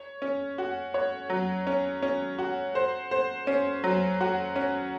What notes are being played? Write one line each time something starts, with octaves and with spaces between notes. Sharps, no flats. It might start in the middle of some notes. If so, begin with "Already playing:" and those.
Already playing: C#5
C#4
F#4
C#5
F#3
C#4
C#4
F#4
C5
C5
C#4
F#3
F#4
C#4